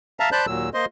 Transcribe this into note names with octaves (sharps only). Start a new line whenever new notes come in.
E5 F5 A5 A#5
C5 D5 A5 B5 F#6 G6
D#2 A#2 F#3 E6
A#3 C5 D#5 C6